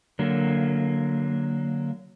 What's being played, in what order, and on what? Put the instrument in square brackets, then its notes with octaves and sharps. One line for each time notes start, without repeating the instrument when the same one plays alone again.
[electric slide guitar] D3 F#3 A#3